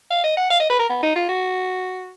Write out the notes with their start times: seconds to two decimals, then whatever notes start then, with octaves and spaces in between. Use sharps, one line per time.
0.10 F5
0.24 D#5
0.37 F#5
0.50 F5
0.60 D#5
0.70 B4
0.79 A#4
0.89 B3
1.02 D#4
1.15 F4
1.29 F#4